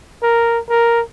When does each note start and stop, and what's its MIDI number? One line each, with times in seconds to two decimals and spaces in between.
0.22 0.59 70
0.69 1.01 70